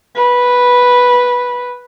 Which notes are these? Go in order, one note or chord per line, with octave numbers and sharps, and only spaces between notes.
B4